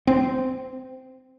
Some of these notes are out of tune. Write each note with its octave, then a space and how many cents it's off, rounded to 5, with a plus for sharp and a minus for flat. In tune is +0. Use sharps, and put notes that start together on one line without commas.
C4 -15